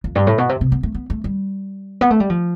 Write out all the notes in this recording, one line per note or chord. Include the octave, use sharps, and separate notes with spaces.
F2
G2
A2
B2
C3
C3
B3
A3
B3
A3
G3
B3
A3
G3
F3